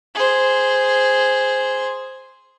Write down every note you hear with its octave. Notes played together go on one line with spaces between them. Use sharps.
G#4 C5